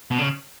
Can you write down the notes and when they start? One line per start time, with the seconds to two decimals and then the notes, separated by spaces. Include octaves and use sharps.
0.11 B2
0.18 C#3